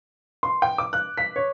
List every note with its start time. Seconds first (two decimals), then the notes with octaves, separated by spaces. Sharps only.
0.43 C6
0.62 G5
0.78 D6
0.93 F#6
1.18 B6
1.36 C#5